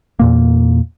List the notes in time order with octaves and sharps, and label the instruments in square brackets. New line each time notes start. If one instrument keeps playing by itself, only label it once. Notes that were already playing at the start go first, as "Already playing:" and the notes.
[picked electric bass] E2 A#2 A#3